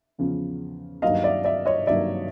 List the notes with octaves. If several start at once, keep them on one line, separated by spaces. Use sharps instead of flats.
E2 C#3 F3
G2 D#3 F#3 A#3 D#5 F5
D5 E5
D5 E5
C#5 D#5
G2 D#3 F#3 A#3 D5 E5